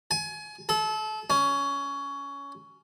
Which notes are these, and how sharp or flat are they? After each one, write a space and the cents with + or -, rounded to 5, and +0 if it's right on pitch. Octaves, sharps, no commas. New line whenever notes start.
G#5 +30
A4 -30
C#4 +15